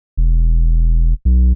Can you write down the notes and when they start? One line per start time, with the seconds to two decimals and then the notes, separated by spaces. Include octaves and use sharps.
0.17 E1
1.25 B1